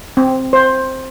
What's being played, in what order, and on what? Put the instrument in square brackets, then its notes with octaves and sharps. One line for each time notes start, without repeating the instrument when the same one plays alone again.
[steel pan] C4
C5